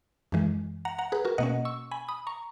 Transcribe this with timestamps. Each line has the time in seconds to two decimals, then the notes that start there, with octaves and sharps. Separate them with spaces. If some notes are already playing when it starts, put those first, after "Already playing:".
0.32 F#2 E3 G#3
0.85 F#5 A#5
0.99 F#5 A#5
1.12 G#4 B4
1.25 F#4 A#4
1.38 B2 A#3 C#4 D#5 F#5
1.65 C#6 E6
1.91 G#5 B5
2.08 B5 D#6
2.27 A#5 C#6